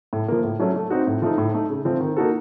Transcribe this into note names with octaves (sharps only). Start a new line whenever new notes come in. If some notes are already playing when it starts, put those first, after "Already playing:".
A2
F3 A#3
A2
F#3 A3 C#4
A3
C4 D#4 F#4
A2
F3 A3 D#4
A2
A3 D#4
C#3
F3 A3 C4
D#3
A#3 D#4 F#4 A4